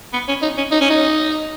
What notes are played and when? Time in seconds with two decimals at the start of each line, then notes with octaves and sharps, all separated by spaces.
0.13 B3
0.28 C#4
0.42 D#4
0.57 C#4
0.71 D#4
0.81 C#4
0.90 D#4